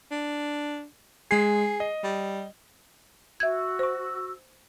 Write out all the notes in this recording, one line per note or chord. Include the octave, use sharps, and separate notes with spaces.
D4
G#3 G#4 C7
D#5
G3
F#4 E5 E6 G6 G#6
C5 C#6